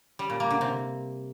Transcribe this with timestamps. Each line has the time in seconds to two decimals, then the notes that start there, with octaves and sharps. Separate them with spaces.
0.19 G3
0.30 A#2
0.40 A#3
0.51 D3
0.61 C3